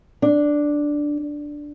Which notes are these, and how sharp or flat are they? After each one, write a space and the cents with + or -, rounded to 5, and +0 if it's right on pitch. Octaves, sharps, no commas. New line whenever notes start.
D4 +0